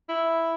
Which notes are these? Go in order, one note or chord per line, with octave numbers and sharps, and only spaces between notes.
E4